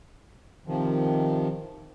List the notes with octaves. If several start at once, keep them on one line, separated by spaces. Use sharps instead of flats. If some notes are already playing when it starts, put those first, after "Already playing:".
C3 D#3 F3